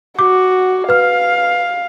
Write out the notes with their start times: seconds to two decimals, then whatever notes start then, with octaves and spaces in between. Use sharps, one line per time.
0.19 F#4 D6
0.89 B4 F5 F6